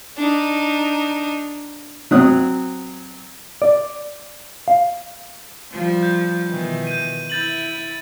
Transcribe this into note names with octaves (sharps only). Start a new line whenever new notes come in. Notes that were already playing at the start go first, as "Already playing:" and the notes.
D4 D#4
F#3 C4 C#5 D#6 F#6
D5
F5
F3 G3
G6
B2 D#3 E3
G6 D#7
E4 G6 A6 F#7